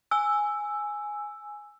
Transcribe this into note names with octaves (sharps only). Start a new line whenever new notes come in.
G#5 E6